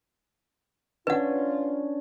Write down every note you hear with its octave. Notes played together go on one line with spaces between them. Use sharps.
C#4 D4 F4 B4 F#5